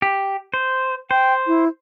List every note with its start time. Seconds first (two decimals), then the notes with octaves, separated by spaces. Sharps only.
0.02 G4
0.54 C5
1.11 C5 G5
1.47 E4